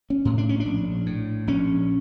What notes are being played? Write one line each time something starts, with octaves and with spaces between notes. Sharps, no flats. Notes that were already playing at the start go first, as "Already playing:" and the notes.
C#4
A2
D4
C#4
D4
A#1
A2
A#1 C#4